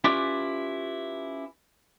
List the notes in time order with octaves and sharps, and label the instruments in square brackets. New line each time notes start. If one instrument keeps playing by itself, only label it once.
[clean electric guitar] C#4 E4 F4 G4 B4 D5